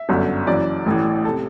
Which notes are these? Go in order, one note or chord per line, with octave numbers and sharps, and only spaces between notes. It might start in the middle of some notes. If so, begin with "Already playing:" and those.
Already playing: E5
G1 F#2 D3
F#1 F#2 E3 D5
A1 A2 E3
C3 A4